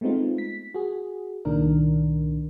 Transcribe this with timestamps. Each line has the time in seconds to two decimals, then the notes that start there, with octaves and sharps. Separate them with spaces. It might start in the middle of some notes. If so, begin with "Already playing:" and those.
0.01 G#3 A3 B3 C4 D#4 F4
0.38 B6
0.74 F#4 G#4
1.45 C2 A#2 D#3 D4 A#4